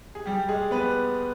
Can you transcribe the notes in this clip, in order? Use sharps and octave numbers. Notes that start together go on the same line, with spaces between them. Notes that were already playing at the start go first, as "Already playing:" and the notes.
G#4
G3 G4
G#3 G#4
B3 B4